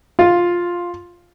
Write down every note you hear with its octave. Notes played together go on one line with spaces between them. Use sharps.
F4